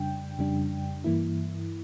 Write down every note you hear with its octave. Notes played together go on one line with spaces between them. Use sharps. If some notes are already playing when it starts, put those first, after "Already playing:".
Already playing: F2 C#3 G3 D4 G5
F2 C#3 G3 D4
G2 E3 A#3 E4